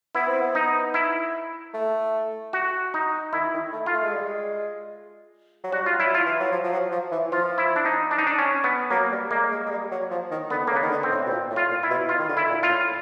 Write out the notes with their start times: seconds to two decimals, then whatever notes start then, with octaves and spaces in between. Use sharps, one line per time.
0.15 B3 E4
0.28 C4
0.41 B3
0.55 D#4
0.94 E4
1.74 A3
2.53 F#4
2.94 D#4
3.33 D#3 E4
3.53 D#3
3.73 A3
3.86 F4
3.94 A3
4.03 G#3
4.13 G3
4.22 G#3
5.64 F#3
5.72 G3 F#4
5.86 F4
5.98 F#3 E4
6.14 F4
6.25 E3
6.40 F#3
6.52 F3
6.63 F3
6.72 F#3
6.91 F3
7.12 E3
7.32 F3 F4
7.58 E4
7.76 D4
7.85 D#4
8.11 D4
8.18 D#4
8.27 D4
8.38 C#4
8.64 B3
8.91 F#3 A#3
9.12 G3
9.31 G#3 A#3
9.51 G#3
9.66 G#3
9.70 G3
9.91 F#3
10.10 F3
10.31 D#3
10.50 D3 B3
10.67 C#3 A#3
10.76 B3
10.82 D#3
10.90 D3
11.03 C4
11.11 A2
11.26 B2
11.30 A#2
11.51 A2
11.56 F4
11.70 A#2
11.83 E4
11.90 B2
12.09 F4
12.19 D#3
12.29 D3
12.37 E4
12.50 A#2
12.63 F4
12.69 A2